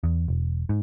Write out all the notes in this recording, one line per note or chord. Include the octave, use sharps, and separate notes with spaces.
E2
E1
G#2